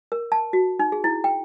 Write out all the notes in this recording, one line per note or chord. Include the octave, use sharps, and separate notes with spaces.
A#4
A5
F#4
D#4
G#4
E4
G5